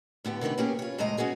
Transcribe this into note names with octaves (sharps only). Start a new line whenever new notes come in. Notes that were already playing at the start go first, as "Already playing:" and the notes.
A2 D3 B3 G4
C3 D#3 C#4 D4 B4
A#3 C#4 G4 G#4
F4 C#5
F2 A2 C3 G#3 D#5 A#5
B3 C#4 F#4 G#4 A#4